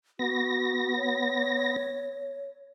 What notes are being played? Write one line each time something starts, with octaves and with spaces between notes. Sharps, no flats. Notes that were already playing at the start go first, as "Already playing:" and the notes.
B3 F#4 A#6
C#5